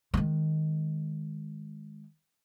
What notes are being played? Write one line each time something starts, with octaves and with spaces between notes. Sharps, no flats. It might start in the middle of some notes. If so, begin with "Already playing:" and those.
D#3 G#3